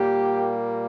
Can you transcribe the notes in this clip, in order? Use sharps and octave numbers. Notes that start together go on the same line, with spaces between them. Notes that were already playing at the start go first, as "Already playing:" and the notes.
Already playing: A#2 G3 A#3 G4